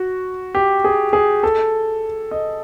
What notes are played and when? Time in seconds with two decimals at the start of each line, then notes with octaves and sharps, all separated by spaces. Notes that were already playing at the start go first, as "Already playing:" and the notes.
Already playing: F#4
0.55 G4
0.85 G#4
1.13 G#4
1.43 A4
2.31 D#5